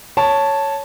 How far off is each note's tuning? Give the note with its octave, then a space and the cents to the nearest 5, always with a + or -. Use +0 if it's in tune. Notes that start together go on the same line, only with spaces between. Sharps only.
C#5 +0 A5 +0